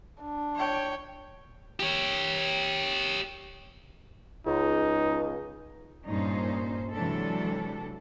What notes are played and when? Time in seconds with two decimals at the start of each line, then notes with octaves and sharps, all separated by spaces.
0.22 D4
0.55 C#5 G5
1.80 G4 C#5
4.47 C#2 D#4
6.08 G2 A#2 C#4 D#4 C5
6.92 C3 E3 F#3 G#3 D4 A4